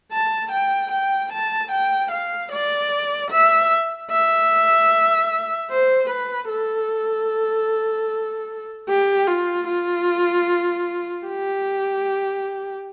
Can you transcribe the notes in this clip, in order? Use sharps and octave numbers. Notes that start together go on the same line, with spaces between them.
A5
G5
G5
A5
G5
F5
D5
E5
E5
C5
B4
A4
G4
F4
F4
G4